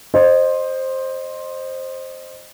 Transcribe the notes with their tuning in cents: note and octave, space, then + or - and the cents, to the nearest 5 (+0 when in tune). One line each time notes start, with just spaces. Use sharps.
C5 +10 D#5 -20